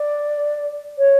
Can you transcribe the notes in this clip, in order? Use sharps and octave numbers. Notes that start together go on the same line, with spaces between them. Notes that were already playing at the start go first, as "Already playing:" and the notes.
Already playing: D5
C#5